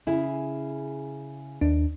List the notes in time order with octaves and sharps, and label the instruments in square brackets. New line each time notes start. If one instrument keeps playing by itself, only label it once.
[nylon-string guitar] C#3 E4 G#4
[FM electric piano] D#2 D4